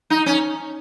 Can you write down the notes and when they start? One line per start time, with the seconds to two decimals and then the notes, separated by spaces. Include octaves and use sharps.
0.10 D#4
0.26 C#4